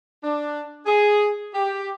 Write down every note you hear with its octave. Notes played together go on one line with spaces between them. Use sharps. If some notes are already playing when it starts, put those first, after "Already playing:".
D4
G#4
G4